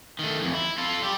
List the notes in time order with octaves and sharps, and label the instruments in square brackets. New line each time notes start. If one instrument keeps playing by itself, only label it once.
[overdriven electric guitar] D#3 A3
F2 E3
E4
F4 A4
G3 G4